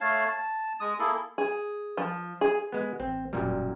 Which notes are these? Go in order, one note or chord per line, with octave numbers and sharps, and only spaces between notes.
A3 C#5 F5 A5
A5
G#3 D#6
A#3 E4 G#4 A4
G#4
F3
G#4
G#3 B3
A1 C4
E1 F#2 A#2 G3